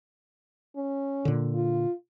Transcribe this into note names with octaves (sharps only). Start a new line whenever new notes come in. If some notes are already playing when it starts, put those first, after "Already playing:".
C#4
A#2 D3
F4